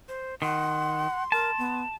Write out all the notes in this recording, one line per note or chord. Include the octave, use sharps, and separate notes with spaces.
C5
D#3 F#5 C6
A#4 A5
B3